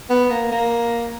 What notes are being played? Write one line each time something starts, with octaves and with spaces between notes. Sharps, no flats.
B3
A#3
A#3